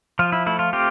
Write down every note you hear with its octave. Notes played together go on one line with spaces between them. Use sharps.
F3 F4
E4
A3 E4
F4
C4 F4 G4